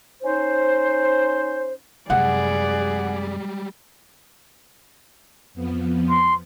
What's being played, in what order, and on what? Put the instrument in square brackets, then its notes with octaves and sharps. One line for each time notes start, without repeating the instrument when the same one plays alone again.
[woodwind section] C#4 D#4 C5
[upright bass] F#2 C3 [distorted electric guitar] G3 G#3 [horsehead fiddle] G#4 D5 [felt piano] F#5
[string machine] F2 F3 B3
[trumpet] C6